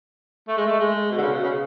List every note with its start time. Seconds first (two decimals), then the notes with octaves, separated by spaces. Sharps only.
0.48 A3
0.57 G#3
0.67 A3
0.80 G#3
1.11 B2
1.18 D3
1.22 C#3
1.32 B2
1.43 C#3